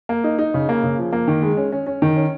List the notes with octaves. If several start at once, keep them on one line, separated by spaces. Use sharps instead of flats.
A#3
D#4
D#4
C#3
A#3
C#3
F3
A#3
D#3
G#3
C#4
C#4
C#4
D#3
C#4